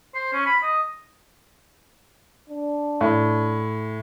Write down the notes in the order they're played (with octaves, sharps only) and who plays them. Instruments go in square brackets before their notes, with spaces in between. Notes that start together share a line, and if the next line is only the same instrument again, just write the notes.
[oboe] C5
C#4
B5
D#5
[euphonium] D4
[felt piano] A2